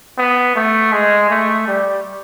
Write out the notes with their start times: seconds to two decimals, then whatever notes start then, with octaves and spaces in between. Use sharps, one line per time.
0.18 B3
0.56 A3
0.92 G#3
1.30 A3
1.68 G3